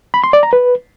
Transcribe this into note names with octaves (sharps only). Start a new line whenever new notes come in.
B5
C6
D5
A#5
B4